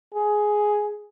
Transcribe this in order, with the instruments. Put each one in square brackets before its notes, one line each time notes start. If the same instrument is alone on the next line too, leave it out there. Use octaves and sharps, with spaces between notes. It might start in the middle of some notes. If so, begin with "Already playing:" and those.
[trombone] G#4